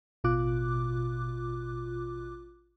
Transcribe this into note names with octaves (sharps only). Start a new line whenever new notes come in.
A1 B2 F4 D6 F#6